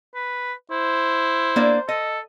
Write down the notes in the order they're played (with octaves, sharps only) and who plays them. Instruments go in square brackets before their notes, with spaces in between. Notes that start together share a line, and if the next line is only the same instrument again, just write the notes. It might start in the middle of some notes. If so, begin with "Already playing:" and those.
[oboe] B4
[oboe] E4 [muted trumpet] C5
[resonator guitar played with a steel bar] A#3 D4 D5
[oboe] A4 [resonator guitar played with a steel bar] D#5